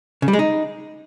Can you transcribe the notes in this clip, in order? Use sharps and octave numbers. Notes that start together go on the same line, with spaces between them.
C#3
G3
G#3
D#4